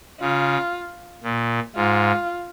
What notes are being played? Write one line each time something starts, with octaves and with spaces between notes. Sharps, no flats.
C#3 F4
A#2
G#2 F4